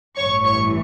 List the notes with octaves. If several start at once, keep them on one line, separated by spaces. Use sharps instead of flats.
A1 G2 E3 C#5 C#6
C#5 C#6